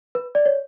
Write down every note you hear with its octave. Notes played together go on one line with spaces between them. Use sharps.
B4
D5
C#5